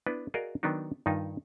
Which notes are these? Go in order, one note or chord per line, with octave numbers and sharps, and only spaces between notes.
B3 D4 E4 B4
F#4 G#4 A#4 D5 D#5 F5
D#3 F#3 B3 D4 D#4
G2 D#3 D#4 F4